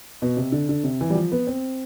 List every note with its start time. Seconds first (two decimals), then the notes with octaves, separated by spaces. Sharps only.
0.22 B2
0.37 C3
0.52 D3
0.69 D3
0.84 C3
1.01 E3
1.10 G3
1.15 F3
1.32 B3
1.47 C4